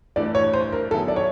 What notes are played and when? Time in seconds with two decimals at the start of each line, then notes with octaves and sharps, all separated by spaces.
0.16 G2 E3 A3 D4 D5
0.35 C#5
0.54 C5
0.72 A#4
0.91 D#3 F#3 B3 E4 G#4 A4
1.08 D5
1.16 C#5